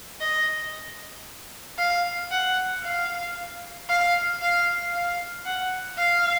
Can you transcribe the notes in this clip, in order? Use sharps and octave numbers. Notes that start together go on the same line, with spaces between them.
D#5
F5
F#5
F5
F5
F5
F5
F#5
F5